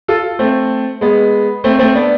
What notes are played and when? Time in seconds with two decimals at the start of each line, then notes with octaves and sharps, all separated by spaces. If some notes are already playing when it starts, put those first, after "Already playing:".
0.08 F4 A4
0.39 A3 C4
1.01 G#3 B3
1.64 A3 C4
1.79 A3 C4
1.95 B3 D4